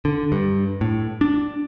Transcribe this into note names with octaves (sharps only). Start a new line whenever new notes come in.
D3
G2
A2
D4